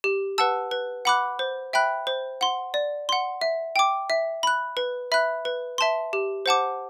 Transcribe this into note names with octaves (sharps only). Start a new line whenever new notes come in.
G4
B4 F#5 A5 E6
B4
F#5 B5 D6 F#6
C5
E5 G5 B5 F#6
C5
F#5 C6
D5
F#5 C6
E5
G5 D6
E5
B5 F#6
B4
E5 B5 F#6
B4
E5 A5 C6
G4
C5 F#5 A5 D6